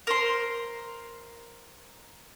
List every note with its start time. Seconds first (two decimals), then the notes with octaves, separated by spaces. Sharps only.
0.07 A#4 C5 C6